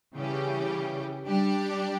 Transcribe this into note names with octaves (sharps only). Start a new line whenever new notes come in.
C#3 E3 G3 C#4 G4
G3 D4 G4 D5